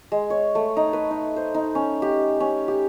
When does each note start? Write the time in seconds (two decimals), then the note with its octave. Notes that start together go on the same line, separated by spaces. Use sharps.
0.12 G#3
0.30 C#5
0.55 A3
0.77 D#4
0.93 B4
1.11 D#4
1.36 C5
1.54 D#4
1.75 C#4
2.02 G4
2.40 C#4
2.68 G4